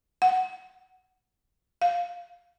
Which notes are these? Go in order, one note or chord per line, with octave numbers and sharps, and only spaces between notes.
F#5
F5